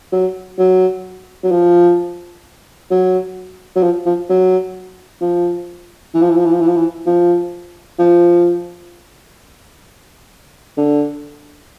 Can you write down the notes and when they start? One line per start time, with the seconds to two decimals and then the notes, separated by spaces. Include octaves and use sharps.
0.12 F#3
0.59 F#3
1.44 F#3
1.51 F3
2.91 F#3
3.76 F#3
3.83 F3
4.06 F3
4.29 F#3
5.21 F3
6.14 E3
6.22 F3
6.30 E3
6.37 F3
6.46 E3
6.53 F3
6.61 E3
6.68 F3
6.76 E3
7.07 F3
7.99 F3
10.77 D3